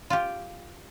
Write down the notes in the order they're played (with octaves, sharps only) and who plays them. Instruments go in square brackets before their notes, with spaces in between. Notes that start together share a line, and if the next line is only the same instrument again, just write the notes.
[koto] F4 G4